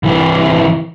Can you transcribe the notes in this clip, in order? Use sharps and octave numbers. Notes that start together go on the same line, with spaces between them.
C2 E3